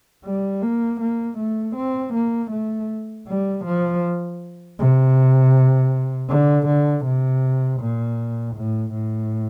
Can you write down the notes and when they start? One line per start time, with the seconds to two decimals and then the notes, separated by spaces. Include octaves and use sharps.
0.25 G3
0.62 A#3
1.00 A#3
1.38 A3
1.76 C4
2.14 A#3
2.51 A3
3.27 G3
3.65 F3
4.78 C3
6.29 D3
6.67 D3
7.04 C3
7.80 A#2
8.55 A2
8.93 A2